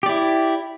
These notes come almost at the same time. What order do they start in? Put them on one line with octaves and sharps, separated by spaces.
G4 D5 E4